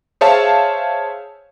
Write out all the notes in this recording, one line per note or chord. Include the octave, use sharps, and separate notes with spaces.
G#4 C5 C#5 E5 F5 A5